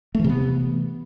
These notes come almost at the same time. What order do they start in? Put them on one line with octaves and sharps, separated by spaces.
A3 E3 C3 B3